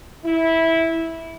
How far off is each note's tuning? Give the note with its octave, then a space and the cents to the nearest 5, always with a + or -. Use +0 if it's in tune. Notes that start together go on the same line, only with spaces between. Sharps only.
E4 -10